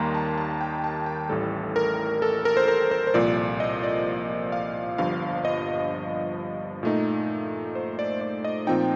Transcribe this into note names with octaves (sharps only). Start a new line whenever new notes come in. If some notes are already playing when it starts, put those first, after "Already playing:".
Already playing: D#2 D#3 G3 A#3 D#4 A#5 C6
A5
A5
G5
A5
G5
A1 A2 G3 A4
A#4
A4
A#4
C5
A#4
C5
C5
C2 A#2 F3 D5
D5
D#5
D5
F5
G1 G2 F3 F5
D#5
A#2 A3 D#4
C5
D5
D5
D#5
A#2 F3 C4 D#4 G5